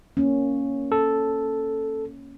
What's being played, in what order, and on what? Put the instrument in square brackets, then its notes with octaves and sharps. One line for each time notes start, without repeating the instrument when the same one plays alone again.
[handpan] A#3 C#4
[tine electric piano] A4